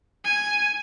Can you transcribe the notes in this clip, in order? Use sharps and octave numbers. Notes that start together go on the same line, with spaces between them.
G#5